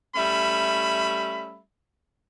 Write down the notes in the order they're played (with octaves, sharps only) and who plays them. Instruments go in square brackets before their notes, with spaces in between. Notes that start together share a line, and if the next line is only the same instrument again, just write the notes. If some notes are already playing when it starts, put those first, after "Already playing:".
[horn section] G3 A3 C#4 E5 B5